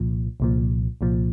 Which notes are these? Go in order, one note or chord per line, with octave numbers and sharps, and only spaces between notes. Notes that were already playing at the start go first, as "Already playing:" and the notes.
Already playing: C2 A#2 F3
C2 A#2 F3
C2 A#2 F3